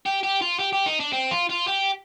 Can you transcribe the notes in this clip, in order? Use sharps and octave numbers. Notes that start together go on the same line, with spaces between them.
G4
G4
F4
G4
G4
D#4
D4
C4
F4
F4
G4